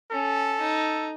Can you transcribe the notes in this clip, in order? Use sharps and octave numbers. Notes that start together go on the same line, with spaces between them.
C#4 A4
D#4